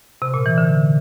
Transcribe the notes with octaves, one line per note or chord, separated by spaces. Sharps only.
C3
A#2
E3
D3